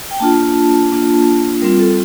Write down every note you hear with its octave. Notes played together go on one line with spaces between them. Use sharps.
G5
A#3 D4 F4 A5
A#3 D4 F4
G3 C4 F4 A#4
A4